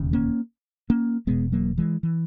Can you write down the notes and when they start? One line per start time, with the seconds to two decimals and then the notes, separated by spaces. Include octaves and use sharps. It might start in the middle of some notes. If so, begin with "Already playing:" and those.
Already playing: E1 D#2 C#3
0.13 A#3 C#4
0.90 A#3 C#4
1.27 E1 E2 B2 G#3 B3
1.52 F#3 A#3
1.78 E3 G#3
2.03 E3